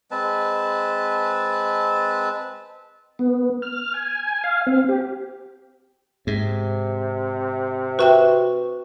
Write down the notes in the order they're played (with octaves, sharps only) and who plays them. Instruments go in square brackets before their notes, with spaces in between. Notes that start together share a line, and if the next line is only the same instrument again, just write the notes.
[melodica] G#3 C4 B4 A5
[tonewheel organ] B3
F6
G#5
F5
C4
G4
[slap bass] G#2 [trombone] C3
[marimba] F#4 E5 G5 [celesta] B4 C#6